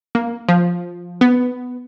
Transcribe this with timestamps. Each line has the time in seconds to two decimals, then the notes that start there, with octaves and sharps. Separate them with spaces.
0.15 A#3
0.49 F3
1.21 B3